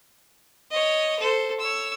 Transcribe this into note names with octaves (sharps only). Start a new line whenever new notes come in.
C#5 D#5
A4 C5
C#5 E6